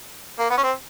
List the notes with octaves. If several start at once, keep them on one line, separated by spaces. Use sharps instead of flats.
A#3
B3
C#4
C4